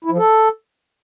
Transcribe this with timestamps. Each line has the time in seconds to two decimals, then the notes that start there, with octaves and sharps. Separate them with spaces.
0.05 E4
0.11 F3
0.18 A4